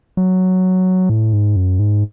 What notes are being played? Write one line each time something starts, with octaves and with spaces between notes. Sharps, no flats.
F#3
A2
G#2
F#2
G#2